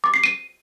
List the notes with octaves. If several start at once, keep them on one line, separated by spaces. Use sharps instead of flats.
D6
C7
D#7